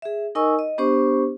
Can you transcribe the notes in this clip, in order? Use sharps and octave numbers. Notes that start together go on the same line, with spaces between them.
G#4 E5
D#4 A#4 D#5 G#5 C#6 E6
D#5
B3 D4 G4 C5 C#6